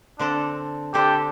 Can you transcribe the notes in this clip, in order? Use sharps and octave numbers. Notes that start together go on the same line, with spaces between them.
D3 C4 D4 A4
D3 C4 D4 G4 A4